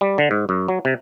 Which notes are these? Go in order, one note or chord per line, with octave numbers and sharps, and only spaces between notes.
G3
D3
G#2
F#2
F#3
C3